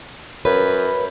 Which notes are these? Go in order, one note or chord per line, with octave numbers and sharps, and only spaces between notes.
F#2 B4